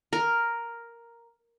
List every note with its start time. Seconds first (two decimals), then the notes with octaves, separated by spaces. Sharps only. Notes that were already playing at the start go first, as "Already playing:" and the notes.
0.13 A#4